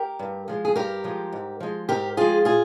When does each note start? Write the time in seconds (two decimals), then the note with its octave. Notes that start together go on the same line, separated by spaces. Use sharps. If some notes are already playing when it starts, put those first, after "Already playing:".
Already playing: G4 A#4
0.19 G2
0.48 F3 G#3
0.65 G#4
0.76 G2 G4 A#4
1.04 F3 G#3
1.33 G#2
1.60 F3 G#3
1.89 G#2 G4 A#4
2.17 F3 G#3 F4 G#4
2.45 A#2 F4 G#4